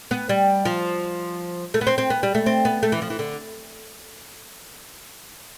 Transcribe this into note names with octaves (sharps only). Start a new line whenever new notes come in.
B3
G3
F3
A3
B3
C4
C4
B3
G3
A3
C4
B3
A3
E3
F3
E3
D3